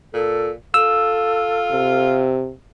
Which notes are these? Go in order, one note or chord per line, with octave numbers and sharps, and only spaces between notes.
A#2 A4
F4 A4 E6
C3